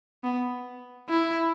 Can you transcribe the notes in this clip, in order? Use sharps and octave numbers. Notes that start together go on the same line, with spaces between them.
B3
E4